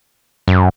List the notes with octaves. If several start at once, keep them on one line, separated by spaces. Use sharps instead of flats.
F#2